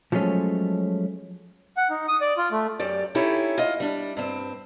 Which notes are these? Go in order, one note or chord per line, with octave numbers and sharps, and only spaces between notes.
F3 F#3 G#3 A3 C#4
F#5
D#4
D#6
D5
F4
A3
F#2 G4 D5
C#4 D#4 E4 G4 A4 C#5
F4 D#5
G3 D4
G2 C4